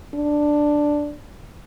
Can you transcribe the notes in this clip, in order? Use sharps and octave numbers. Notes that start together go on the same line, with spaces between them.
D4